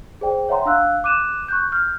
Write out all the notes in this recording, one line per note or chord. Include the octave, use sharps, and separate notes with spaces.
G#4 C5 D5 G5
C#5 E5 F#5 G5 A#5 C6
D4 F5 E6 F#6
D6 F#6 D#7 E7
C#6 F#6 G6
F6 G6